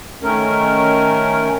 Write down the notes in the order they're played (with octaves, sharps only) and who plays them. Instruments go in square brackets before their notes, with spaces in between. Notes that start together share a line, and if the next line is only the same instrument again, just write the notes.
[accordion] D#3 A3 C#4 A#4